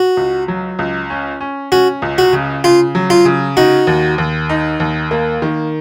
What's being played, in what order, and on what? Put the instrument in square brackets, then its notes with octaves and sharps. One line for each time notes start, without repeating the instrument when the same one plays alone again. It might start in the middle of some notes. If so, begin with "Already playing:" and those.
Already playing: [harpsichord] F#4
[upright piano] C#2
F#3
C#2
C#4
C#4
[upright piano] C#4 [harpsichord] F#4
[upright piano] C#2
[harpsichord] F#4
[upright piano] C#3
[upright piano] C#3 [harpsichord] F4
[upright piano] F#3
[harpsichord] F4
[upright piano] C#3
[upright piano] D#4 [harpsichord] F#4
[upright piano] D#2
D#2
D#4
D#2
A#3
D#3